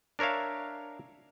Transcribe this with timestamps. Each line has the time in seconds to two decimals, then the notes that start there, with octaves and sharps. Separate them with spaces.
0.19 D4 A#4 C#5 E5 F5